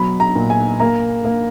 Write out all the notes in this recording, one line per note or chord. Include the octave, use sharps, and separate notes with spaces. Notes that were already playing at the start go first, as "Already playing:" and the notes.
Already playing: B2 F#3 B5
A#5
A#2
G#5
A#3 A#5
A#3